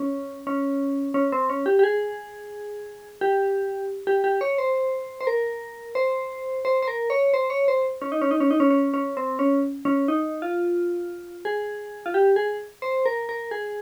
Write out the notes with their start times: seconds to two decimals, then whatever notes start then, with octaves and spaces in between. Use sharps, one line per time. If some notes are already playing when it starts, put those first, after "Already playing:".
Already playing: C#4
0.47 C#4
1.14 C#4
1.32 C4
1.50 C#4
1.66 G4
1.79 G4
1.83 G#4
3.21 G4
4.07 G4
4.24 G4
4.41 C#5
4.58 C5
5.21 C5
5.27 A#4
5.95 C5
6.65 C5
6.82 C5
6.88 A#4
7.10 C#5
7.34 C5
7.50 C#5
7.68 C5
8.02 C#4
8.12 D#4
8.22 C#4
8.31 D#4
8.40 C#4
8.51 D#4
8.60 C#4
8.71 C#4
8.94 C#4
9.17 C4
9.39 C#4
9.85 C#4
10.08 D#4
10.42 F4
11.45 G#4
12.06 F4
12.14 G4
12.36 G#4
12.82 C5
13.06 A#4
13.29 A#4
13.51 G#4